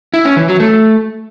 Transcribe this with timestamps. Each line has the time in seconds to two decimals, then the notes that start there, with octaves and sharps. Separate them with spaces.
0.14 E4
0.25 C#4
0.37 E3
0.48 F#3
0.60 A3